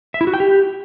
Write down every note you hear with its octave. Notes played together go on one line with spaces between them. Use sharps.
E5
E4
F#4
G5
G4